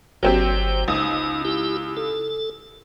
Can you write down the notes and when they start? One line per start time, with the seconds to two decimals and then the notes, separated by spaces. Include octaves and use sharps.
0.23 G1 F#3 C4 G4 G5
0.88 C#2 D#4 D#6
1.45 E4 G4
1.97 A4